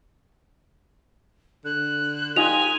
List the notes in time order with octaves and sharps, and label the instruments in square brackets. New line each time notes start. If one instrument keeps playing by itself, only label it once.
[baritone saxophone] D3 [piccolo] F#6
[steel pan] D#4 F4 D#5 [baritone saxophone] G4 [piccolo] G#5 [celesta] F7